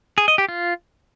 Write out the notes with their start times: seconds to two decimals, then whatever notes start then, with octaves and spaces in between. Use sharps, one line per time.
0.18 G#4
0.28 D#5
0.38 G4
0.49 F4